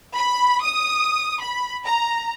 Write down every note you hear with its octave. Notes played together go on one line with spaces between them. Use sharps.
B5
D#6
B5
A#5